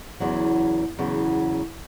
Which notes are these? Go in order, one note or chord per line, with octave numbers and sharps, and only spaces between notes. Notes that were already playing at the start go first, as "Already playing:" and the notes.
E2 C#3 F#3
E2 C#3 F#3